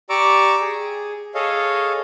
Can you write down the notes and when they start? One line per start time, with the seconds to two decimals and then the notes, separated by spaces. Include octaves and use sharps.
0.10 G4 D5 A#5 C#6 D6 E6
0.61 G#4
1.35 G#4 A4 C#5 D#5 F5